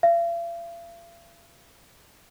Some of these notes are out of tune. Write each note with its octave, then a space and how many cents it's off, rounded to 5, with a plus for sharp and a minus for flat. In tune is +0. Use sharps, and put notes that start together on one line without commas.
F5 -45